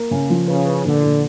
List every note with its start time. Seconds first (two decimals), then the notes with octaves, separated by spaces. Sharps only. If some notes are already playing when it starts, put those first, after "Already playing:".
Already playing: A#3
0.11 C#3
0.30 F3
0.48 C#3 B4
0.66 B4
0.85 A#2 D3
1.03 A#2